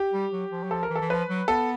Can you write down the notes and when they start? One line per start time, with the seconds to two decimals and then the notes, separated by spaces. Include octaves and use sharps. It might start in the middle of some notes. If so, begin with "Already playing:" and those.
Already playing: G4
0.13 G3
0.31 F#3
0.51 F3
0.64 F#3
0.71 F3 A4
0.83 A#4
0.90 E3
0.95 A4
1.01 E3
1.10 F3 B4
1.29 F#3
1.48 B3 A4